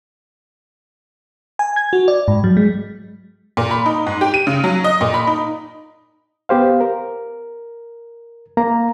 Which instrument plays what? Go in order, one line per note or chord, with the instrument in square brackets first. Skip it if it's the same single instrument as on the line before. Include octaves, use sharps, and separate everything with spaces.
[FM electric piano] G#5
G#6
F#4
D5
G#2
F#3
G#3
[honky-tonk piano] A#2
B5
D#4
G#2
G4
D#7
C#3
F#3
D#5
A#2
B5
D#4
[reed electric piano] B3 G4 C5 F5
A#4
A#3 A#5